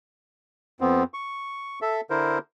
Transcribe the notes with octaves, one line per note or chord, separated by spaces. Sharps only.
F2 B3 C4
C#6
A4 E5
D3 E4 A#4 C5